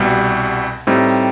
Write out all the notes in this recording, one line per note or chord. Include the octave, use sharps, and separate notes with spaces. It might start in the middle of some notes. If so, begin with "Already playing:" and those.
Already playing: C2 B2 G3
A2 G3 C4 D#4